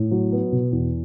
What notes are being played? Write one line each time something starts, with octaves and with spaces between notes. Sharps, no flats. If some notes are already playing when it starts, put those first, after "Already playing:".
Already playing: A2
F#3
B3
B2
E2